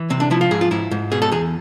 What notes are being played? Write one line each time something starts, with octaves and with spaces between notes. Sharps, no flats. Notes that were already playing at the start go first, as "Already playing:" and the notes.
Already playing: E3
C3 C4
D4
F3 E4
F4
G#2 G#4
F4
G#2 E4
G#2
B2 G#4
A4
E2 G#4